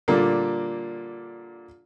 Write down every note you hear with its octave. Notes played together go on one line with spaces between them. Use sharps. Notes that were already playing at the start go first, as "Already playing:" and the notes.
A#2 D3 G3 A#3